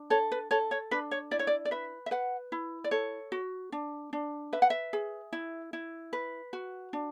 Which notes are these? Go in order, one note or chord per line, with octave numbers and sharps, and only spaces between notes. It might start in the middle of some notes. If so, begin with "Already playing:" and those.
Already playing: D4
A4 C#5
B4
A4 C#5
C#5
D4 B4
C#5
E4 D5
C#5
D5
D5
B4 E5
E5
B4 F#5
E4
D5
A4 C#5
F#4
D4
D4
B4 E5
F#5
E5
G#4
E4
E4
B4
F#4
D4